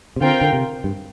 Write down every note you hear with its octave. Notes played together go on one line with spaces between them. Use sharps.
C3
D3 C4 F4 A#4 G5
D3
C3
G2